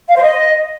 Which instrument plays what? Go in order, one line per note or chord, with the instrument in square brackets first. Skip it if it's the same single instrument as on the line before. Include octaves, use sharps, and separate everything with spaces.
[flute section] F5
C5
D#5